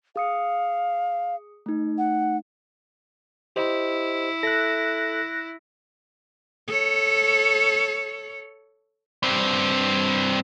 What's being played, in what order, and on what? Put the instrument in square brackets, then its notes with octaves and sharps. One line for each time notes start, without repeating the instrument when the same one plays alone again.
[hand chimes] G#4 D#6 C#7 [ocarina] F5
[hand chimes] A3 D#4
[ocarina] F#5
[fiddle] E4 [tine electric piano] G4 C5 D#5
[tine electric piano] A4 E5 [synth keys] F#6 A#6
[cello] A4 C#5
[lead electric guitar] G2 C4